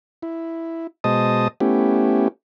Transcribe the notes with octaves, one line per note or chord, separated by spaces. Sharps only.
E4
B2 G#3 C5 D#5 A5 D#6
A3 B3 C#4 E4 G4